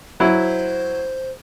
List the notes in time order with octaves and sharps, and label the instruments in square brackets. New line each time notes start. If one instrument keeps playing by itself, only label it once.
[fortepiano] F#3 E4 [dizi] C5